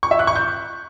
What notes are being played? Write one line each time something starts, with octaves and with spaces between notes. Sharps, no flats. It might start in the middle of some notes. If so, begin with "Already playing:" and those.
C#6
E5
F#6
C#6
G6